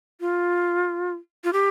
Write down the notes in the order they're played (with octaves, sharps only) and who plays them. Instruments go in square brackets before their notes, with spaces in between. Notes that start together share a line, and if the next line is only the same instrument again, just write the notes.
[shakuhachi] F4
F4
G4